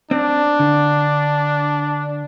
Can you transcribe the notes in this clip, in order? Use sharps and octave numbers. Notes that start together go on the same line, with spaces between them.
C4 D4
D3